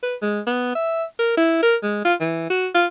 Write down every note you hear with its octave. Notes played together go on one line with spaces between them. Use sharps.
B4
G#3
B3
E5
A#4
E4
A#4
G#3
F4
E3
F#4
F4